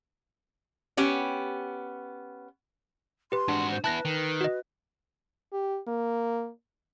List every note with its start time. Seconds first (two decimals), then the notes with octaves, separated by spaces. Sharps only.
0.97 B3 C#4 G4
3.32 G4 B4 C6
3.48 G#2 D4 F#4
3.71 C5
3.84 B3 E4 B4 A5 F#6 A#6
4.05 D#3
4.41 F#4 D#5
5.52 G4
5.87 A#3